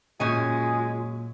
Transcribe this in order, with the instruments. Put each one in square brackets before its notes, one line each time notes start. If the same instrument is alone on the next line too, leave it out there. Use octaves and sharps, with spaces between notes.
[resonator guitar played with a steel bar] F#2 C#4 G#5 [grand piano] A#2 [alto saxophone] G#3 [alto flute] F4